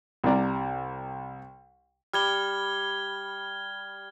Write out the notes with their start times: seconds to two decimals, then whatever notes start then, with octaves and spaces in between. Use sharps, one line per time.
0.24 C2 C3 D5 A#5
2.13 G3 F6 G#6 G7